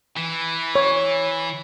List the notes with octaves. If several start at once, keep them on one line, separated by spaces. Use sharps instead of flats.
E3
C#5